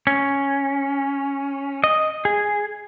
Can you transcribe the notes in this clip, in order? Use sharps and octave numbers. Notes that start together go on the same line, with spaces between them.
C#4
D#5
G#4